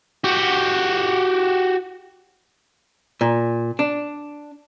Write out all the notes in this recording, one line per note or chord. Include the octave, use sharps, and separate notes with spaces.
F#4 G4
A#2
D4